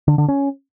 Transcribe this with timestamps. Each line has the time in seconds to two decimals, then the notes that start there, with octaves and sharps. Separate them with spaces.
0.08 D3
0.18 D3
0.28 C#4